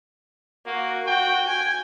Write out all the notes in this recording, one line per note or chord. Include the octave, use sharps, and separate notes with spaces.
A#3 F#4
F#4 G5
G#5